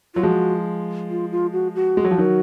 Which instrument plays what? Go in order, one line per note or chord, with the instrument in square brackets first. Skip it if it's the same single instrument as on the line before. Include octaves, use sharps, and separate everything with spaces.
[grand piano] F#3 [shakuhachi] F4
[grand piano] F3 G#3 [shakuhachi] F#4
[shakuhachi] F4
F4
F#4
F#4
[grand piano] G#3
F#3
F3
D#3 F#3